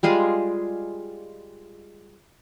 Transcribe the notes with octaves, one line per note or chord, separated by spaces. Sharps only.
G3 G#3 F4 G#4